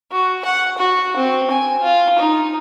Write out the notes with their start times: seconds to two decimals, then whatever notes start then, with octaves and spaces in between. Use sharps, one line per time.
0.12 F#4
0.45 F#5
0.78 F#4
1.17 C4
1.50 G#5
1.82 F4
2.18 D#4